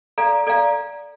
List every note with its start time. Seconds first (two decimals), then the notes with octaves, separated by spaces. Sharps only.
0.18 A4 D5 F5 A#5
0.47 A4 D5 F5 A#5